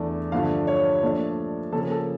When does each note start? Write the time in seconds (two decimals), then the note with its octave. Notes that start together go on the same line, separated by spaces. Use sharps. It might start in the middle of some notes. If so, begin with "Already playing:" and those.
Already playing: E2 E3 A3 D4
0.32 G2 D3 F3 A3 D4 F5
0.67 C#5
1.02 A#2 F3 A3 D4
1.72 C#3 F3 A#3 C#4 A4
1.91 A4